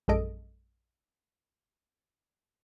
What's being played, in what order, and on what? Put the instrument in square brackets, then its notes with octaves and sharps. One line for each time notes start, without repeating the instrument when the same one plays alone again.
[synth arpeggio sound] A#1 F#2 G#3 A4 D#5 D7